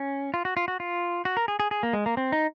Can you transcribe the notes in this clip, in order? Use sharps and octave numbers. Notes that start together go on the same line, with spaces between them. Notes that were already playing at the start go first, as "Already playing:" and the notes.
Already playing: C#4
F4
F#4
F4
F#4
F4
F#4
A#4
G#4
G#4
G#4
A#3
G#3
A#3
C4
D#4